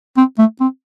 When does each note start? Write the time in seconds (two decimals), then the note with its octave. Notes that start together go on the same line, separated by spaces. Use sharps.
0.17 C4
0.38 A3
0.60 C4